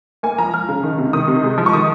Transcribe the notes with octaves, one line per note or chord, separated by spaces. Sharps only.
A#3 G#5
F3 A#5
F3 F6
C#3
D#3
C3
D#3 D#6
C3
G#3
F3
C#6
D#3 D#6